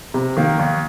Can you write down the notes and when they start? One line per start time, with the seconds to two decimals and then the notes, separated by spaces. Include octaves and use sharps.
0.14 C3
0.37 D#3 A#3
0.59 D#2